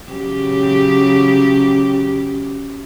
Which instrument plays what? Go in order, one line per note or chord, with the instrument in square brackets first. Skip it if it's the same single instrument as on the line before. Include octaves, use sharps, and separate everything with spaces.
[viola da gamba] C#3 F#3 G4